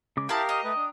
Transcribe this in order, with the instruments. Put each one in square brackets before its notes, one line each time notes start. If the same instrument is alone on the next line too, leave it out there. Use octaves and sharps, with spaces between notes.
[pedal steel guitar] C#3 G#3 D6
[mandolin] E4 A5 [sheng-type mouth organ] G4 A#4 F5 [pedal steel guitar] G5 A#5 D#6
[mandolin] D#5
[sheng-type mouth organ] A3 B4
D4